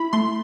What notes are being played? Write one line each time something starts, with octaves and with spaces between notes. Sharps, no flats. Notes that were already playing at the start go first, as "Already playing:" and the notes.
Already playing: E4 B5
A3 C6